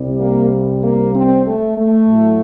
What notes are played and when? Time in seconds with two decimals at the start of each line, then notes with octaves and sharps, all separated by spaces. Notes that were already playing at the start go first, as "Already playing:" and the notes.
Already playing: C2 C3 G3
0.19 A#3
0.82 A#3
1.13 C4
1.45 A3
1.76 A3
2.08 A2 F#3